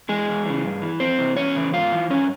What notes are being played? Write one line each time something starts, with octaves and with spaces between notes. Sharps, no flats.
E3 G#3 G#4
E2
C#3 E3
G2
E3
F2 C4 C5
C3 E3
E2 C#4 C#5
C#3 E3
G#2 F4 F5
E3
G2 C#4 C#5